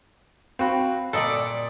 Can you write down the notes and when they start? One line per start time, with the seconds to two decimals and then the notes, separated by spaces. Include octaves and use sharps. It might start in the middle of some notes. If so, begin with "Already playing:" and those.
0.59 C4 F#4 F5 G5 B5
1.13 A#2 A4 D5 D#5